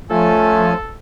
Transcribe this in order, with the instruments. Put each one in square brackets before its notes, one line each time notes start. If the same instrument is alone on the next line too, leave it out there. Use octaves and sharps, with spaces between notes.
[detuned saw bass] F3 [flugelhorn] A3 [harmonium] C#4 F4 G#5 [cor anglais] A4